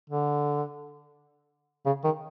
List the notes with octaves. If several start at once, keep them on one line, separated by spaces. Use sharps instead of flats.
D3
C#3
D#3